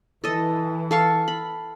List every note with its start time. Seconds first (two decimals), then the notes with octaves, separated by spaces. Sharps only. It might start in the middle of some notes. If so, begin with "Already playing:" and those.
0.24 E3 A4 D#5
0.91 A4 F5 C#6
1.28 B5